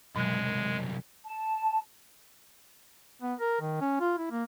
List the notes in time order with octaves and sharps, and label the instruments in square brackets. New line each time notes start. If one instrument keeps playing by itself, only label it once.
[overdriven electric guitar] C2 F#2 [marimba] B2 F#3 [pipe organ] G#3
[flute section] A5
[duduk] B3
A#4
D#3
C#4
F4
E4
A#3